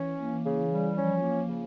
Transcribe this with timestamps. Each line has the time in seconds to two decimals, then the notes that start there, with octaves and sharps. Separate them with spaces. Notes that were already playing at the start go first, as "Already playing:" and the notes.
Already playing: E3 C#4
0.19 A#3
0.45 C#3
0.71 G3
0.96 F3 C#4
1.23 A#3
1.49 C#3